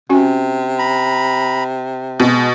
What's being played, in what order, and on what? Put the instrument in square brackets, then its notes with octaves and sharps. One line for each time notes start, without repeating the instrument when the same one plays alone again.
[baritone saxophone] C3 [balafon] C#4 F#4 G#5
[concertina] A#5 B5
[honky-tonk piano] B2 [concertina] G#3